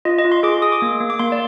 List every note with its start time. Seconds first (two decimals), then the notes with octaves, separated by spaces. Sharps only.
0.05 F4 D#5
0.19 D#5
0.25 F4
0.32 C6
0.43 G#4 D6
0.62 G#4 D#6
0.72 D6
0.82 A#3
1.00 A#3
1.10 D6
1.19 A#3 C6
1.32 D5